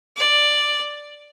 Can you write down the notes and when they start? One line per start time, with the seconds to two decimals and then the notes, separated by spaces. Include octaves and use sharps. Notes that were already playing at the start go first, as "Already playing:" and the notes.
0.17 D5